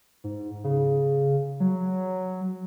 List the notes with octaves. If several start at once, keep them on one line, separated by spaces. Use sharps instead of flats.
G#2
C#3
F#3